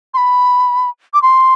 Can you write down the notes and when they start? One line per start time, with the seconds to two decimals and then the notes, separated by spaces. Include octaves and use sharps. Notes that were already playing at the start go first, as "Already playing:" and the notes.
0.14 C6
0.17 B5
1.14 D6
1.22 C6